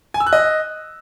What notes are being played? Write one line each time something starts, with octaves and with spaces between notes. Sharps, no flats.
G#5
E6
F#6
D#5